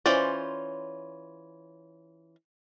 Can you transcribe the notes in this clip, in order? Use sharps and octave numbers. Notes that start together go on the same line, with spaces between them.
E3 C#4 F4 C5 D5